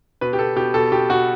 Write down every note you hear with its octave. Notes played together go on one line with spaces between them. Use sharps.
B2 B4
G4
B2 A4
B2 G4
B2 A4
B2 G4
B2 F#4